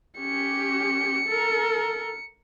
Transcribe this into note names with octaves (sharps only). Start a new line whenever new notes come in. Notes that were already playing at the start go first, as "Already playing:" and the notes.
C#4 G4 C#7
A4 A#4